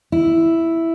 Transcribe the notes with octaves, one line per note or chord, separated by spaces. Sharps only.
E4